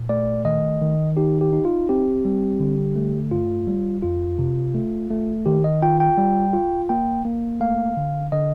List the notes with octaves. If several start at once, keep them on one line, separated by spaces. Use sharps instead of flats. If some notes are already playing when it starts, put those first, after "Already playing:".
Already playing: A#2
A3 D5
D#3 D#5
D#3
D#4 G4
G4
D#4
F4
C4 G4
G3
D3
A3
G2 F4
G3
F2 F4
C3
A3
A3
D#3 G4
D#5
F4 G5
G5
G3
F4
A#3 G5
A#3
A3 F5
D3
D3 D#5